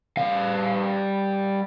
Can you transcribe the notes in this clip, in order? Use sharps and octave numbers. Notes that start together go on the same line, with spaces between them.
G3 F5